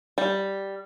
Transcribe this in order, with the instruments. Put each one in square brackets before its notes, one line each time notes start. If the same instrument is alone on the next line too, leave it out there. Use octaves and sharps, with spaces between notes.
[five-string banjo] G3